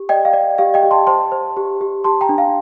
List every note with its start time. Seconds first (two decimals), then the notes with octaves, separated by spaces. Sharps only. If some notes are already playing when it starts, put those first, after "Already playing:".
Already playing: G4
0.09 D5 D#5 G5
0.25 F5
0.33 D5
0.58 G4 F5
0.74 D#5 G5
0.83 G4
0.91 A5 C6
1.07 C5 A5 C6
1.32 C5
1.57 G4
1.81 G4
2.04 G4 A5 C6
2.21 G5 A#5
2.29 D4
2.38 F5